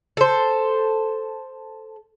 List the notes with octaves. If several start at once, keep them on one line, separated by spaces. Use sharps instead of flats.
A4 C5